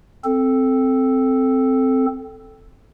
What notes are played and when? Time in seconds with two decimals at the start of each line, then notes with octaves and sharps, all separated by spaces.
0.24 C4 A4